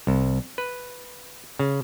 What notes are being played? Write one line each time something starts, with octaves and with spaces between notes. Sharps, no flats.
C2
B4
C#3